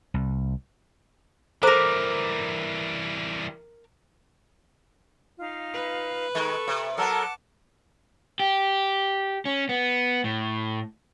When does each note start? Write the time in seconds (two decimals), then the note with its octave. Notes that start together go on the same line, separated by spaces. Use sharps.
0.14 C2
1.63 E3 G3 A4 A#4 C5 A#5 D6
5.39 D#4 F4 F5
5.73 B4
6.35 D#3 G#3 A4 C#6
6.68 C3
6.98 F#3 B3 A4 A#4 F#5 A5 D6
8.40 G4
9.45 C#4
9.69 B3
10.24 A2